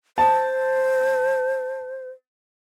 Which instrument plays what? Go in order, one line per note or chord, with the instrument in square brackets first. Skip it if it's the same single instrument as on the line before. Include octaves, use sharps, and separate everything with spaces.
[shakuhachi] C5 [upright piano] A5